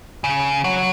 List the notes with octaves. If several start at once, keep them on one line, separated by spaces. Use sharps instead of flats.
C#3
F#3